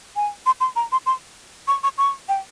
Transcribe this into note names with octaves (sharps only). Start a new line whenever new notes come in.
G#5
C6
C6
A#5
C6
C6
C#6
C#6
C#6
G5